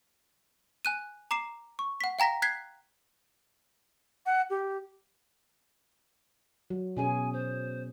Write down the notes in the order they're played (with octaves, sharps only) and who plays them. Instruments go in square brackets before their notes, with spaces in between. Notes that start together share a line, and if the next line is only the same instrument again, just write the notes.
[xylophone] G#5 F#6 D#7
A#5 D6 C7 E7
C#6
F#5 B6
F5 G5 A#5 A#6 B6
F#6 G#6 B6 C7
[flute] F#5
G4
[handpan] F#3
[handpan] B2 C#4 G#4 [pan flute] G#5
[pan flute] C5